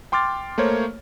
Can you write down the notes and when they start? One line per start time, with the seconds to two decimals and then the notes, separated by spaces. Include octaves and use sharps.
0.12 G5 C6 D6 F6 A6
0.58 A3 A#3 C5 C#5